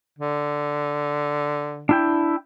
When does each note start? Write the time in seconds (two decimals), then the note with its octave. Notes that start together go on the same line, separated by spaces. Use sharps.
0.18 D3
1.89 D4 E4 G5